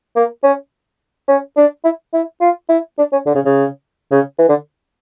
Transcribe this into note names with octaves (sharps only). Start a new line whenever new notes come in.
A#3
C#4
C#4
D4
E4
E4
F4
E4
D4
C#4
D3
C#3
C#3
C#3
E3
D3